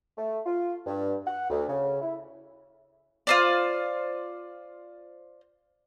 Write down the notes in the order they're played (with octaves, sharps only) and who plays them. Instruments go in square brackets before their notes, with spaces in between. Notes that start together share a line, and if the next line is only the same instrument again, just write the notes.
[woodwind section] A3
F4
G2
F#5
D2
C#3
E4
[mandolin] F4 C5 D5